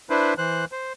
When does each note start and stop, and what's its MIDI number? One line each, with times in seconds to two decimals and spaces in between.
0.10 0.34 62
0.10 0.34 64
0.10 0.34 71
0.10 0.34 72
0.38 0.65 52
0.38 0.65 72
0.38 0.65 90
0.72 0.93 72